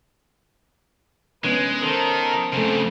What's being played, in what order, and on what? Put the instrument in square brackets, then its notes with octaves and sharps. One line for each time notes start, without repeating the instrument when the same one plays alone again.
[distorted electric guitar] G#3 [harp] B3 C#4 D7 [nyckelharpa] B4
[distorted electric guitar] D#3 [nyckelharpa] A4 A#4 [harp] C5
[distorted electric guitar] F2 C#3 [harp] A3 C4